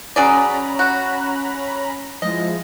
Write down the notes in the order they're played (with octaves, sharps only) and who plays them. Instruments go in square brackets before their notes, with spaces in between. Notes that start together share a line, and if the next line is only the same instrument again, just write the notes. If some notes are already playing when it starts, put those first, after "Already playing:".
[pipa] F#3 G#4 D5 [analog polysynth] C#4 A#5 B5
[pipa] F#4
[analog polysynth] F3 G#3 E4 [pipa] D#5